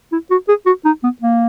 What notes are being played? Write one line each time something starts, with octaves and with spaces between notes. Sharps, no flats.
E4
F#4
G#4
F#4
D#4
B3
A#3